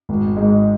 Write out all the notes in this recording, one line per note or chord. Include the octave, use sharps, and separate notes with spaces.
G#1
G#2 G#3